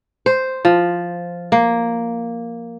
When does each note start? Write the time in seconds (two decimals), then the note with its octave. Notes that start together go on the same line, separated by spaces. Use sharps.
0.26 C5
0.65 F3
1.52 A#3